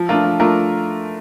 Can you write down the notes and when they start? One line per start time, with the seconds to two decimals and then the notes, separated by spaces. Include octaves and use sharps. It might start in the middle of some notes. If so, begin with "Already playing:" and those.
Already playing: F3
0.09 A3 D4 F4 A#4
0.24 F3
0.40 A3 D4 F4 A#4